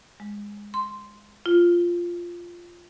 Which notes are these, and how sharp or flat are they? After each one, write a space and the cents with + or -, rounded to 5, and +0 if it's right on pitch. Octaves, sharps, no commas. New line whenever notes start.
G#3 -15
C6 -5
F4 -5